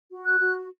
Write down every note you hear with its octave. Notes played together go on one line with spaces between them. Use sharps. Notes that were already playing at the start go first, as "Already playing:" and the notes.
F#4
F#6
F#4